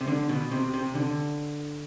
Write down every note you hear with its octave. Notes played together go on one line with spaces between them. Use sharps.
C3
D3
B2
C3
C3
D3